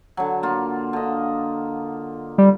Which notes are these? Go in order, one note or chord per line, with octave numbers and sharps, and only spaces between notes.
D3 F#3
A#3 F4
D3 D#5
G3